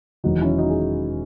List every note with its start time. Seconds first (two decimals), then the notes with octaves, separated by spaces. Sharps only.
0.24 E1 E2 D#3 F#3 D#4 F#4
0.41 C#4 E4
0.58 D#4 F#4
0.70 G#4